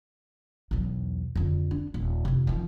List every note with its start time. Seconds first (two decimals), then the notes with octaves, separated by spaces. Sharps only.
0.71 B1 E2
1.36 F2 D3
1.71 D4
1.94 D#1
2.25 F2 C3
2.47 D#3 F3